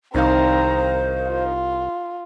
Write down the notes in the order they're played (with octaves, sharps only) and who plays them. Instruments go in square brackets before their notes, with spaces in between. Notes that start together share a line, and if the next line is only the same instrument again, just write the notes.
[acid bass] C2 [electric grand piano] D#3 D#4 F5 [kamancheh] C4 A#5 [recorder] C5
[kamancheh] F4